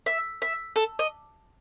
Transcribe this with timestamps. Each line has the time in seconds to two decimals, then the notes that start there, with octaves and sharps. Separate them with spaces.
0.06 E5
0.42 E5
0.76 A4
0.99 D#5